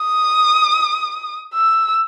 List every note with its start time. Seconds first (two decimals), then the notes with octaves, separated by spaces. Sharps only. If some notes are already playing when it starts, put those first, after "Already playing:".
Already playing: D#6
1.54 E6